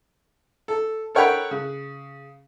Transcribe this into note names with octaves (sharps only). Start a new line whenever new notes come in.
A4
A4 A#4 C#5 F#5 G5 B5
C#3